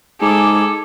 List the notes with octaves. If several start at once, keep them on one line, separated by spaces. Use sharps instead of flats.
G#2 G#4 A4 D6